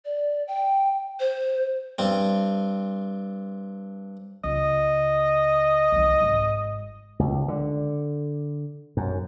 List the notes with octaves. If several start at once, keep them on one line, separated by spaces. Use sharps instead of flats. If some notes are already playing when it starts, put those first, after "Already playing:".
D5
G5
C5
G2 C4
C#2 D#5
C2 D#3
G#1
C#2
D3
F#2